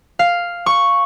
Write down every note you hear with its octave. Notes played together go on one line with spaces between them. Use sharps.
F5
C#6